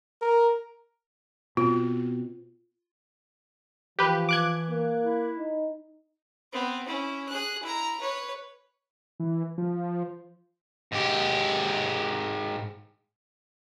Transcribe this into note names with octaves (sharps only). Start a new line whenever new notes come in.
A#4
B2 C4 F4
E3 F3 G4 B4
D6 F#6 G#6
A#3
E4
D#4
B3 C4
C#4 E4
G#4 F#6
E4 A#5
B4 C#5
E3
F3
G#2 G4